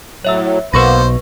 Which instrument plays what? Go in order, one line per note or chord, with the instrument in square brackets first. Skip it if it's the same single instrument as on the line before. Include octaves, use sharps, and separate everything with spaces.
[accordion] A2 F#3 [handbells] C#5 E5 E6
[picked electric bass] B1 B2 [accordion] A#3 B3 [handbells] B4 C#6 A#6 [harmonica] C5